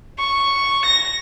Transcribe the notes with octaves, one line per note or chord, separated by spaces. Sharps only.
C#6
A#6